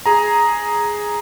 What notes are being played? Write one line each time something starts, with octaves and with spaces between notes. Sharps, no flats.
G#4 A#5